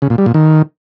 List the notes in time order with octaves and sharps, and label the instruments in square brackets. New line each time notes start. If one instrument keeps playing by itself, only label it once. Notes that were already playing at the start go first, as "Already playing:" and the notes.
[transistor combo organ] C#3
A#2
G3
A#2
D#3